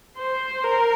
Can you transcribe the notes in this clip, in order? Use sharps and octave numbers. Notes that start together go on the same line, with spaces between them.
C5
A#4